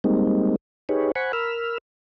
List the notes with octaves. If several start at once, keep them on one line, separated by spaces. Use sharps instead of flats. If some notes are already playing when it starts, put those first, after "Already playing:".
G3 G#3 A#3 C4 D#4
D#4 G4 G#4 B4 C#5
C5 F#5 G#5 B5 C#6
A#4 B5 E6 F6